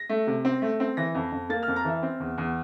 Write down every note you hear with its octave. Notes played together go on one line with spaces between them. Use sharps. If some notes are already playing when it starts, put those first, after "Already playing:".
Already playing: A#6
A3
C3
C4
A3
C4
E3 A#6
F2
F2
A#3 A6
F6
F2
A#5
E3 E5
C4
E2
E2